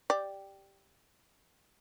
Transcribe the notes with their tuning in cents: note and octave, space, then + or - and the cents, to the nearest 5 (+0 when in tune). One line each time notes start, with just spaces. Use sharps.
G4 +0 D5 +0